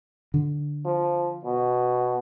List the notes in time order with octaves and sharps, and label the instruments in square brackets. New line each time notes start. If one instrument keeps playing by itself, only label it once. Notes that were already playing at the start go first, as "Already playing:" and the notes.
[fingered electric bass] D3
[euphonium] F3
B2